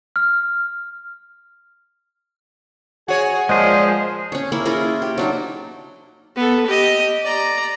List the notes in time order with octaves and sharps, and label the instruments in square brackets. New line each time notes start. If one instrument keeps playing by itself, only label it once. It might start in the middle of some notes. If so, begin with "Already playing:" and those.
[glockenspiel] F6
[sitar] F#4 C#5 [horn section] G#4 G#5
[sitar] A#2 [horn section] F3 [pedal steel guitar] G#3 G#4 [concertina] C5 D#5
[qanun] C#4 C#5
A#3 C#4 E4
E4 F4 G#4 A#4
G4
F#3 D4 D#4
[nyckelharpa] B3 A4
G4 D#5
D5 A#5